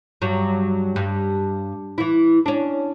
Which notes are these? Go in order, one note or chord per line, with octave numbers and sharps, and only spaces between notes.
G2 F#3
G2
E3 E4
C#4 D4